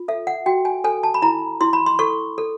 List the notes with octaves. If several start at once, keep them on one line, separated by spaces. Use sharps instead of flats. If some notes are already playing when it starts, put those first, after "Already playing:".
Already playing: F4
A4 E5
F#5
F#4 G5
G#5
A4 G#5
A5
B5
E4 A#5
E4 C6
B5
C6
A4 C#6
A4